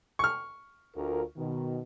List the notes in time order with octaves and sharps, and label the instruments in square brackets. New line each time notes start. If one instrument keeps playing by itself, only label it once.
[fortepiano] C#6 F6
[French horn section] D2 F4 A#4
B2 D#3